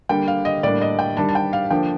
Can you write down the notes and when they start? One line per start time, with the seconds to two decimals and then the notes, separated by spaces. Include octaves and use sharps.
0.09 D3 G3 A#3 G5
0.28 F5
0.45 D#5
0.63 A2 G3 A#3 D4 D5
0.81 D#5
0.99 G5
1.17 D#3 G3 D4 A5
1.29 A5
1.35 G5
1.53 F5
1.70 D3 F3 A#3 D4 G5